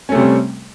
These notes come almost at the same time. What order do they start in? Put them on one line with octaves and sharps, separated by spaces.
C#4 A3 C3 G3 C4